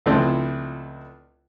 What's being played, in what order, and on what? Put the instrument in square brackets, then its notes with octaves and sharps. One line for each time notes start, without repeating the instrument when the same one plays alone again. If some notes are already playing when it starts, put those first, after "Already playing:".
[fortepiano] C#2 F3 A3 C4 D4 E4